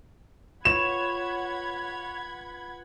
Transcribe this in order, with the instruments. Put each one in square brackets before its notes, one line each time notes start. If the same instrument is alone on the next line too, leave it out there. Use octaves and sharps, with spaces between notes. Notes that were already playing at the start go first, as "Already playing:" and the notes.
[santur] F4 B4 [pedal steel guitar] C#5 [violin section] F#5 B5 G#6 [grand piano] E7